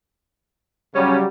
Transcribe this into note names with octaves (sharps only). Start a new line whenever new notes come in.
C#3 F#3 G3 C#4